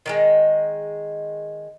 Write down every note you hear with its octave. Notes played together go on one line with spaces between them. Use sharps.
D#3 F#3 G#3